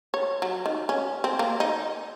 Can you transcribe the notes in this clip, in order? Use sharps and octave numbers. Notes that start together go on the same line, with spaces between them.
C#5
F#3
D#3
C#4
C4
A#3
D#4